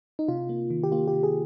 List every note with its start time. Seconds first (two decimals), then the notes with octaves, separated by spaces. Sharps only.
0.19 D#4
0.28 C3 F4
0.49 A#3
0.70 D#3
0.84 G4
0.92 A#3 F4
1.08 G4
1.13 C3
1.23 G#4